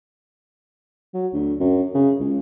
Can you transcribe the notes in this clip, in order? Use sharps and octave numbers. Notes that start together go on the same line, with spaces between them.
F#3
D2
F#2
C#3
C#2